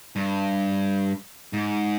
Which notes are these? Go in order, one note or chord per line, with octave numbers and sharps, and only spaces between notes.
G2
G#2